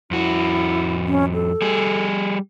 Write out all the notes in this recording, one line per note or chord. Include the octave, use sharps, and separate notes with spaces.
F2 E4 F#4
C#4
A4
G3 G#4